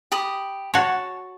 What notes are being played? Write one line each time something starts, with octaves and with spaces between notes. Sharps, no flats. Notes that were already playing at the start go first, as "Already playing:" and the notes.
G4 B5 D#6
F#4 C#5 A5